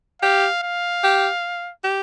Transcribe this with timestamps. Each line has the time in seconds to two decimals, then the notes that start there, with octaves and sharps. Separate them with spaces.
0.22 G4 F5
0.63 F5
1.04 G4
1.84 G4